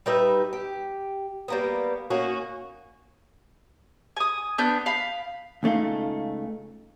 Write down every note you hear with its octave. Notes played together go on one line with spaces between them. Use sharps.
G3 D#4 B4 E5
G4
G3 A#3 B3
A#3 C#4 D#4 F#4
G#5 D#6
B3 D4 G6
F5 B5
C#2 C#3 A3 D#4 F5